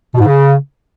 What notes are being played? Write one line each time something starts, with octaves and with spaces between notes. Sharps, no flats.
B2
G#2
C#3